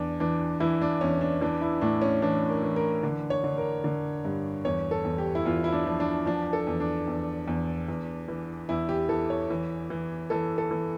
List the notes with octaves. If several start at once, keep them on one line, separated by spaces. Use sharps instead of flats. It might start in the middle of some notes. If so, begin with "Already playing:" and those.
Already playing: E2 D4
E3 D4
E3 E4
D4
E2 C#4
D4
E3 D4
E4
A2 D4
C#4
E3 D4
A#4
E3
A#4
D3
C#5
D3
A#4
D3
G2
E2 C#5
A4
E2
G4
E4
E2 F4
E4
D4
F3
D4
F3 D4
A4
E2
D4
E2
E2
E2
E3
E2 E4
G4
E3 A4
C#5
E3
E3
E3 A4
A4
E3